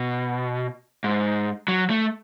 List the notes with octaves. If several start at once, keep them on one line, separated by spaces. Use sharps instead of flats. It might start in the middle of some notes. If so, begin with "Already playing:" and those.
Already playing: B2
G#2
F#3
A3